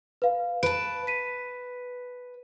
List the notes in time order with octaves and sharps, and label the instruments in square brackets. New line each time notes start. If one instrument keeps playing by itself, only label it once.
[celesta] B4 F5
[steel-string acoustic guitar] B4 A5 [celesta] D7
[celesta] B6 D#7